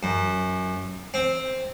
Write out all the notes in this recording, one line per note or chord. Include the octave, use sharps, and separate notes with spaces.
F#2
C4